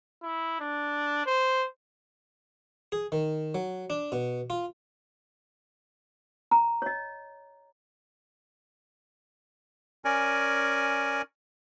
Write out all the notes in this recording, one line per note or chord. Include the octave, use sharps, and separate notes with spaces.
E4
D4
C5
G#4
D#3
F#3
D4
B2
F4
A#5
C#5 D#5
C#4 A#4 D5 G#5